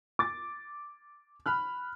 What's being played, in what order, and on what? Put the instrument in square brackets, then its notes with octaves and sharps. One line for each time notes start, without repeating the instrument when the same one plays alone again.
[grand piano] D6 A6
B5 F6 F#6